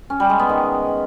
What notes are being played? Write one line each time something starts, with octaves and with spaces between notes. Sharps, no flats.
C#4
G3
G#3
B3
D#3